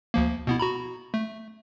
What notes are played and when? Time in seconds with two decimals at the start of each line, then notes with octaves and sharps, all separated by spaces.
0.14 D2 F3 A#3
0.47 B2 B3 E4
0.60 F#4 A#5 B5
1.14 A3